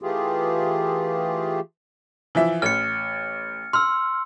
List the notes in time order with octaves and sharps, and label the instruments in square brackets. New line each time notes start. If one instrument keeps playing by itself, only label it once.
[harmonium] E3 A3 F4 G4 G#4
[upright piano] E3 F3 E5
[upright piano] A1 [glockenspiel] F6 C#7
[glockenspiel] C6 E6 [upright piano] F6